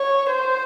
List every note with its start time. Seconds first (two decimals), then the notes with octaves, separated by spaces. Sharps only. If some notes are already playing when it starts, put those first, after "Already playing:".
Already playing: C#5
0.31 C5